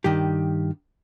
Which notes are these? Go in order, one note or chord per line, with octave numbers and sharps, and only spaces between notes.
G2 D#3 G4